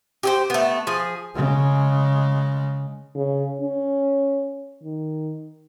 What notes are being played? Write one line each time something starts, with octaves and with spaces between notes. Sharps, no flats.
G4 G#4 C5
A3 B3
F3 G#4
C#3 G#3
C#3
C#4
D#3